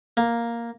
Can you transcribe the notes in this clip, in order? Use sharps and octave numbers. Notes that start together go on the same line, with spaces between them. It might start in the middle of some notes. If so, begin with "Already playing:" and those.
A#3